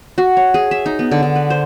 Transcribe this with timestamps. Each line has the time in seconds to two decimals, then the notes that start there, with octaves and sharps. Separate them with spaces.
0.18 F#4
0.37 C#5
0.54 G#4
0.71 E5
0.86 D#4
0.99 B3
1.11 D3
1.23 D3
1.36 B4
1.50 C5